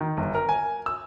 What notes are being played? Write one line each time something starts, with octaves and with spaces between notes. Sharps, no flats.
D#3
G1
A#4
G#5
E6